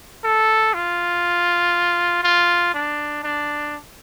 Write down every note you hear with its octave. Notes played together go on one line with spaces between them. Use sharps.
A4
F4
F4
D4
D4